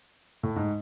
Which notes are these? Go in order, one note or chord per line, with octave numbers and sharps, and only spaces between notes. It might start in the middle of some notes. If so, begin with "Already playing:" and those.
A2
G#2